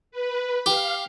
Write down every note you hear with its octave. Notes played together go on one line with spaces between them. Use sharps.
B4
G4 F5